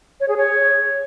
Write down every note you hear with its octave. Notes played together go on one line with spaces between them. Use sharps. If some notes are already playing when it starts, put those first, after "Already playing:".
C#5
G#4
C#5